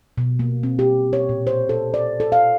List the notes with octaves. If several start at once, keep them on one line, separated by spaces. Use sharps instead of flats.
B2
A#3
C4
G4
C#5
A#2
C5
A4
D5
A4
F5